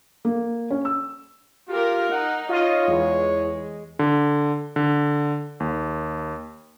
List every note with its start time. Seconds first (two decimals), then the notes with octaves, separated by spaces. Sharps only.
0.25 A#3
0.70 C#4
0.85 E6
1.69 F4 G4 A#4
2.11 D#4 F#5
2.49 F4 C#5 D#5
2.88 E2 G#3
3.99 D3
4.76 D3
5.60 D#2